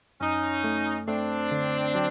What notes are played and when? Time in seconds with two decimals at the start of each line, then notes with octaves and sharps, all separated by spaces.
0.21 F#2 C#4 D#4
0.64 A3
1.08 A3 C4 D4
1.52 D3
1.95 F#3